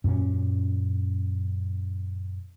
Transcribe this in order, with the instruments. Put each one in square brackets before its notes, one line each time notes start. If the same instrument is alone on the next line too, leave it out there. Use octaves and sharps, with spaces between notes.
[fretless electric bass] F#2 A#2 A#3 C#4